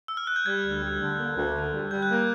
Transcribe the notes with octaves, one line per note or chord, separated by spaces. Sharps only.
E6
F6
F#6
G6
G3 G#6
D2
G3
D3
A#3
D2
D3
G3
G3 G6
F#6
A#3 G6